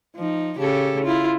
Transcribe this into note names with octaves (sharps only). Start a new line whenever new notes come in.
F3 D#4
C#3 G4 A4
E4 F4